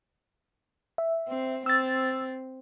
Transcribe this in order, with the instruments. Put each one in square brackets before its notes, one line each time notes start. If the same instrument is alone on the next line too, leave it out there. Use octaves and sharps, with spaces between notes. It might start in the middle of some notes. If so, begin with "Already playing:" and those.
[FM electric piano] E5
[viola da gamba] C4
[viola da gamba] C4 [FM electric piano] E6 A6